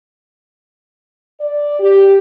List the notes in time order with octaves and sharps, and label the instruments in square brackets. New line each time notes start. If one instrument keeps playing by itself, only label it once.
[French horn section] D5
G4